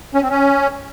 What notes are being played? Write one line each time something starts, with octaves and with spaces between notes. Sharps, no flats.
C#4
C4
C#4